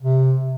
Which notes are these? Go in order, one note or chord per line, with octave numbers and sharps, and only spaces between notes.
C3